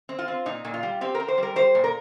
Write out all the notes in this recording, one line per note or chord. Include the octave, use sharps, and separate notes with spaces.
C4
F4
C4
A#2 D#4
A#2
F4
G3
C4 G4
A#4
C4
C5
G3 A#4
G3 C5
A#2
A#4